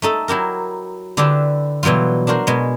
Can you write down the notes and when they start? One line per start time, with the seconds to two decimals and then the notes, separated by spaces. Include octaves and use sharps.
0.02 A3 D#4 A4
0.28 F#3 E4 G4 A#4
1.17 D3 D4 E4 G4 B4
1.83 B2 E3 F#3 G3 F4
2.27 D4 F#4 A#4 C5
2.47 B2 G#3